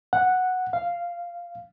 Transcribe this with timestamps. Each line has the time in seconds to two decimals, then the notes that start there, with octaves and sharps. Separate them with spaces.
0.13 F#5
0.73 F5